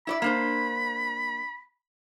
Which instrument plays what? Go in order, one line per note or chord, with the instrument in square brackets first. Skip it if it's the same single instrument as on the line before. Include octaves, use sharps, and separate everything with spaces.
[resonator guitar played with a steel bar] E4 C#5 D5 [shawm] B5
[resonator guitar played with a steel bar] A#3 D4 C5